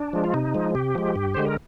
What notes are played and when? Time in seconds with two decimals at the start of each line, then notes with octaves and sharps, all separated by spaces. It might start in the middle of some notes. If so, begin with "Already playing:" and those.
Already playing: D4
0.13 F3 G#3
0.24 F4
0.34 C3 D#4
0.55 F3 G#3
0.75 C3 G4
0.95 F3 G#3
1.16 G2
1.34 D3 G#3 C5
1.46 A#4